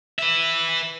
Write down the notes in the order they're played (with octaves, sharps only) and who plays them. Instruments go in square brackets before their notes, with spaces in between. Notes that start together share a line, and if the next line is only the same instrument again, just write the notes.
[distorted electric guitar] B4 E5